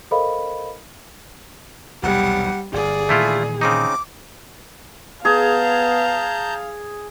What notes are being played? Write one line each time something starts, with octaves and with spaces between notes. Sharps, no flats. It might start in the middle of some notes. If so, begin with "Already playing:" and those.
A4 A#4 C5 D#5 F5 B5
B1 E2 C3 G3 F#5
G1 G#4 D5
A#2 D#3 E3 A3 E4 F4
C#3 C4 D#4 D6
B3 G#4 F5 A5 A#5 G6